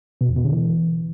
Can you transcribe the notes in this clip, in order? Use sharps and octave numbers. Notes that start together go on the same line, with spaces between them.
B2
E2
B2
D3
E3